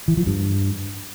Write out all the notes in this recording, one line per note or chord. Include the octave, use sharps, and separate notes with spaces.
E3
F3
G2